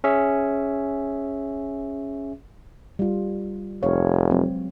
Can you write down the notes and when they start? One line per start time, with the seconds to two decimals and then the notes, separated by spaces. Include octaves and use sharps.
0.04 C#4 G#4 E5
2.99 G3 F4
3.83 F1 B4 C#5 F5
4.31 F#3 G#3 C4